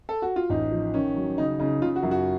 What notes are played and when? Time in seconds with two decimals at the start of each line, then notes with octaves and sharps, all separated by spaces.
0.09 A4
0.22 F#4
0.36 F4
0.50 A1 D#4
0.72 F3
0.94 D#3 C#4
1.16 F#3
1.38 C#3 D#4
1.59 C#3 D#4
1.82 C#3 F4
1.96 F#4
2.03 F#2
2.11 F#4